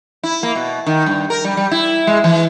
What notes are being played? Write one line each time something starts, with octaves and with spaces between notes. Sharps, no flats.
E4
A#3
B2
D#3
G2
A#4
G3
G3
E4
G#3
E3